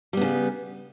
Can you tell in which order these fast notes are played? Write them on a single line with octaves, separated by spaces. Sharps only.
G3 B3 C#3